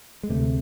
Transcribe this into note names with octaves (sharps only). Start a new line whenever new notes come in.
G#3
D2 C3 A3